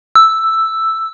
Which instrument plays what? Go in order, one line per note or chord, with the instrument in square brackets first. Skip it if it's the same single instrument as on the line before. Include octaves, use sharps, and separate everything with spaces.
[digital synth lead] E6